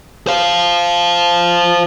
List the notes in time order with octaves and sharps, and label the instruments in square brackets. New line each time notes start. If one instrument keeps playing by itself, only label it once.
[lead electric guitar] C5 F5